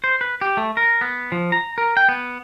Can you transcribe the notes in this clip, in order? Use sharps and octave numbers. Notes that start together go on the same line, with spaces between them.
C5
B4
G4
A3
A#4
B3
F3
A#5
A#4
G5
B3